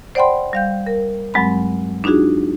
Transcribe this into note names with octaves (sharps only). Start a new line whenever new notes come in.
C5 D5 F#5 G5 B5 C6
G3 F5 G6
A#4
G2 F#3 G#3 C4 B5
D4 D#4 F4 F#4 G#4